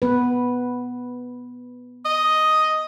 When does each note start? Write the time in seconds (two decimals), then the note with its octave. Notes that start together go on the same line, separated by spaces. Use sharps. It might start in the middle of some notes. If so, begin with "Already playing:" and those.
0.02 B3 B4
2.05 D#5